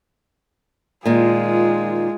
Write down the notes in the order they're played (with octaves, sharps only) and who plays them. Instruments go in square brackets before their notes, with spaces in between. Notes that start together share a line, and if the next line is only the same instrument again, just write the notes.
[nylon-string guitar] A#2 D#3 [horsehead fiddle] G#3 F4